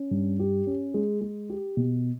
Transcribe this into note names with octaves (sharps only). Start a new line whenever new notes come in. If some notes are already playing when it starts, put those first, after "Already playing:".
Already playing: C#4
G2
G4
C#4
G#3
G#3
G4
B2